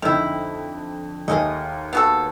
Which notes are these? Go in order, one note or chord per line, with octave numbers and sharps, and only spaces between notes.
F2 D3 D#3 E4
D#2 A3 G#4 A#4 D#5
B3 F#4 A4